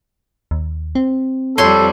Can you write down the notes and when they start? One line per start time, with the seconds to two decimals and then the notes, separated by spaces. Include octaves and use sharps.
0.51 D#2
0.95 C4
1.58 F2 G3 A4 C5 C#5 C6